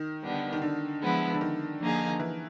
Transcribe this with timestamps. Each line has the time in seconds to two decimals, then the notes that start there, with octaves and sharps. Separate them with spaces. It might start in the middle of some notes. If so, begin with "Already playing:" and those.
Already playing: D#3
0.23 D3 G3 B3 D4
0.53 D#3
0.62 D3
1.01 F3 G#3 B3 E4
1.34 D3
1.41 D#3
1.81 D3 F3 A#3 D#4 G#4
2.19 E3